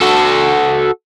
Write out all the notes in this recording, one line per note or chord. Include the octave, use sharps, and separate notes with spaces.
F#4 A4